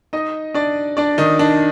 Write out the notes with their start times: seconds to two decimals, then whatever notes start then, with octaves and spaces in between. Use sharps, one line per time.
0.13 D#4 D#5
0.54 D4 D5
0.97 D4 D5
1.18 D#3 D#4
1.39 D4